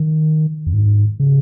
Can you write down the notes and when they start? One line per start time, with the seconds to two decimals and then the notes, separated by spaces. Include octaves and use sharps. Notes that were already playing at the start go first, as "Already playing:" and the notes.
Already playing: D#3
0.67 F2
0.73 G#2
1.20 C#3